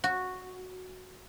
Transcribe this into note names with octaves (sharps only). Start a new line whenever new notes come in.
F#4